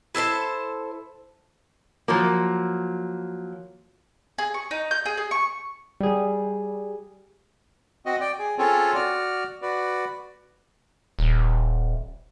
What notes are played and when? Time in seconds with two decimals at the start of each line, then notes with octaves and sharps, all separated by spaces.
0.15 E4 A4 C5 A5
2.08 F3 F#3 A#3
4.38 G#4
4.54 C#6
4.71 D#4
4.91 G6
5.05 G#4
5.17 G#4
5.31 C#6
6.01 G3 G#4
8.06 C4 F#4 D#5
8.21 D5 G5
8.39 G#4
8.58 C4 C#4 F4 G#4 A4 C#5
8.94 F#4 D5 F6
9.62 F#4 B4 D5
11.19 D#1